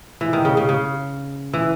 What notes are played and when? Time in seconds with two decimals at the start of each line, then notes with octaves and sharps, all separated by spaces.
0.21 E3
0.33 D#3
0.45 C#3
0.57 C#3
0.69 C#3
1.53 E3